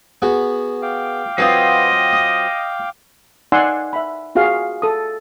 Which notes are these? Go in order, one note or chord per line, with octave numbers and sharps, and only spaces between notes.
B3 F#4 G#4
F5 G5 D6
F#3 C4 F4 B4 D#5 A5 D#6
D#6
D#4 D5 F#5 G#5 C6 E6
E5 B5
F4 F#4 G#4 F5
A4 D#6